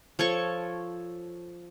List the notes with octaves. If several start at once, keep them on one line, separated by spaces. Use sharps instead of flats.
F3 A4 C#5 C#6